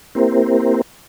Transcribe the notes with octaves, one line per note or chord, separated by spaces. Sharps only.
A#3 C4 E4 G4 A#4 C5